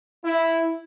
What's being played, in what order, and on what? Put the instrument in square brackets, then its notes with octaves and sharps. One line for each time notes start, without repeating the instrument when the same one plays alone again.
[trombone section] E4